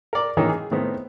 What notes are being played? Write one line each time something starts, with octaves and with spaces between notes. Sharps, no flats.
A#4 D5
D#3 E3 G#3 A#3 C#4 D#4
G#4
A2 D#3 B3 C4